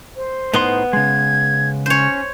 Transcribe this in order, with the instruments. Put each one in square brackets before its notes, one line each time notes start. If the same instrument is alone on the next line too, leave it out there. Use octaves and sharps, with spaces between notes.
[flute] C5
[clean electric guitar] A2 D#4 C6 [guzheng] B3
[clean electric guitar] C#3 G#3 [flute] G#6
[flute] C#4 [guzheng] C5 C#5